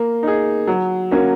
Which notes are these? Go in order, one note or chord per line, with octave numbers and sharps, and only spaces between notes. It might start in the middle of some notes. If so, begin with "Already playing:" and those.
Already playing: A#3
D#4 G#4
F#3
A#3 C#4 F#4